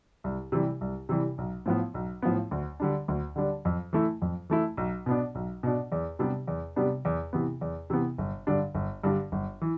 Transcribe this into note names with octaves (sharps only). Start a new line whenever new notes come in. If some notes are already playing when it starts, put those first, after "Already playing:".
C2
C3 E3 G3
C2
C3 E3 G3
B1
A2 F3 B3
B1
A2 F3 B3
D2
D3 G3 D4
D2
D3 G3 D4
F2
E3 A3 E4
F2
E3 A3 E4
B1
B2 B3 D4
B1
B2 B3 D4
E2
C3 G3 B3 D4
E2
C3 G3 B3 D4
E2
C3 E3 B3
E2
C3 E3 B3
G1
G2 D3 G3 D4
G1
G2 D3 G3 D4
G1
E3